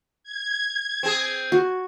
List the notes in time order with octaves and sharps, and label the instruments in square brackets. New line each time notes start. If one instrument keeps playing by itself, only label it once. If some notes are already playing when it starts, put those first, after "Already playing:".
[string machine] G#6
[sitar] C4 G#4
[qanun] F#4